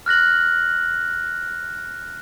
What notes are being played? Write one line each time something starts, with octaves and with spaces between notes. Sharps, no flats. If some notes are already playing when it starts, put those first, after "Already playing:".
F6 F#6 A#6 F#7